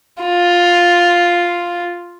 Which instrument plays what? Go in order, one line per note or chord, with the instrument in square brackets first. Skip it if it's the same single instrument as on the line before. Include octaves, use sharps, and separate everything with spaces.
[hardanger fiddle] F4